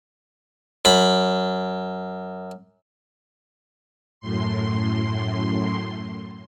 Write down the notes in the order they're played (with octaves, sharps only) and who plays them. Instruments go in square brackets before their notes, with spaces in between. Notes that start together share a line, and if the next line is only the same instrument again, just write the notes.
[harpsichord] F#2 B5
[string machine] F#2 A2 C6